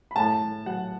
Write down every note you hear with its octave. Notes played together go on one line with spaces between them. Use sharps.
B5
A2 A5
A2
F#3 F#5